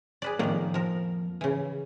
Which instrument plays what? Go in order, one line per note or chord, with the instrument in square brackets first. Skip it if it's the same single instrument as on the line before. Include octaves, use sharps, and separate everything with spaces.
[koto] G#4 B4 D5
[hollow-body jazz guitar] F2 A#3 [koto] A2 D#3 D5
[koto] F3 A#4
C#3 E3